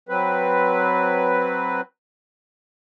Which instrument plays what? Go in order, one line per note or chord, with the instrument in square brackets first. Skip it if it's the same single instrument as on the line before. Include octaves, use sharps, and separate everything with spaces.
[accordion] F#3 C4 B4